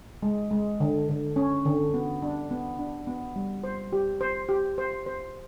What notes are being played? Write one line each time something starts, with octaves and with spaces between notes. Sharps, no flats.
G#3
G#3
D3
D3
C#4
D3
B3
D4
B3
D4
B3
G3
C5
G4
C5
G4
C5
C5